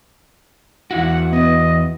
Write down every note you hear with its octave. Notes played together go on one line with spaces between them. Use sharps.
E2 E4 F#4 F#5
B3 D#5